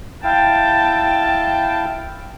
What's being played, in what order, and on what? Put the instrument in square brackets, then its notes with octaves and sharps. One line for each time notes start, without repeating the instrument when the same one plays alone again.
[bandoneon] E4 F5 [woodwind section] G5 [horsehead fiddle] A5